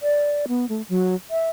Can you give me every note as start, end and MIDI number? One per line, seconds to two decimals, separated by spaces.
0.01 0.46 74
0.48 0.68 59
0.69 0.82 57
0.89 1.15 54
1.31 1.50 76